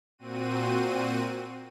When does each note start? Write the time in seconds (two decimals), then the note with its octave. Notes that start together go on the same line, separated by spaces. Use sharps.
0.18 A#2 C4 F#4 D#7